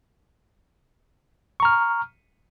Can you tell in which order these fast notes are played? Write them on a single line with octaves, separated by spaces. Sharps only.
C#6 A#5 F6